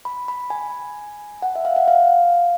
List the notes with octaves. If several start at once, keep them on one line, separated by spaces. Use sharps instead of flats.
B5
B5
G#5
F#5
E5
F5
F#5
F5